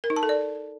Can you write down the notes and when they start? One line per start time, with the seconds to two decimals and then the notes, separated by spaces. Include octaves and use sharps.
0.04 A#4
0.10 D#4
0.16 A5
0.23 A4
0.29 D5